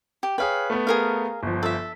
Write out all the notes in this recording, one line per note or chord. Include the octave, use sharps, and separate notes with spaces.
G4
G#4 B4 C#5 F5 G5
A3 B3
G#4 A#4 F5
G1 F3
A4 E5